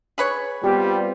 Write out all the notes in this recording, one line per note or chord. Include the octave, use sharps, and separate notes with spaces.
G#4 B4 C#5
G3 B3 C4 F4 G4